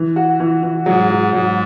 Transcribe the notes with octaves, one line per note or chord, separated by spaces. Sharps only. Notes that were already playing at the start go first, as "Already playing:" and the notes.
Already playing: E3
F#4
E3
E3
G#2 F#3
F#3
G#2 F#3